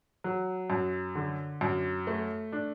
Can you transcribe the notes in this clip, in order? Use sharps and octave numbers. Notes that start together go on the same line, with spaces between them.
F#3
F#2
D3
F#2
A3
D4